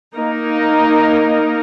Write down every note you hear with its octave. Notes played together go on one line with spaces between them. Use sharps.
A#3 D#4 A#4 D#5